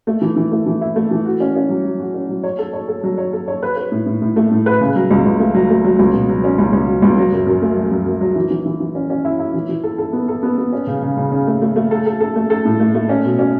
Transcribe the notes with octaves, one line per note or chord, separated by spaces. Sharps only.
A3
E3
E3
A3
E3
E4
A3
E3
F#4
C#4
C#4
F#3
F#3
F#4
C#4
F#3
C#5
A4
C#5
A4
F#3
C#5
A4
C#5
B4
B4
A2
A2
A2
A3
A2
B4
C#3
F#3
C#2
C#2
A3
F#3
A3
F#3
C#2
B2
F#3
C#4
C#2
C#2
F#3
C#2
F#3
F#2
F#2
A3
F#3
F#2
F#2
F#3
E3
E3
E3
E3
C#4
C#4
E4
E4
E3
E3
A4
A4
B3
A4
B3
B3
C#4
C#3
C#3
C#3
C#3
A3
A3
A3
A4
A4
A4
A3
A4
A2
A3
A3
C#4
B2
C#4